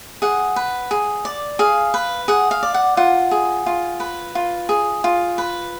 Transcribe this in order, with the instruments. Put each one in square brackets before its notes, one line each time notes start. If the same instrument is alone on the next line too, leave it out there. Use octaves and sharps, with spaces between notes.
[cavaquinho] G#4 F#5
B4
G#4
D5
G#4 F5
B4
G#4 F#5
F5
D5
F#5
F4 F#5
G#4
F4
B4
F4
G#4
F4
B4